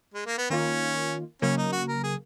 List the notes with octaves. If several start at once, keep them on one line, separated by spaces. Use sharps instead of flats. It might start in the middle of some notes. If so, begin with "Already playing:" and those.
G#3
A#3
B3
D#3 A#3 C#4 F4
C#3 F#3 A#3 C#4
D#4
F#4
A#4
G#4